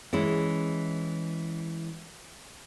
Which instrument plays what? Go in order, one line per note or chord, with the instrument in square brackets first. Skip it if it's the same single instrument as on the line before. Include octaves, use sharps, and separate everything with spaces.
[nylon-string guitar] E3 G#3 C#4 E4